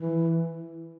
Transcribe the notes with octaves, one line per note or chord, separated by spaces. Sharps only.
E3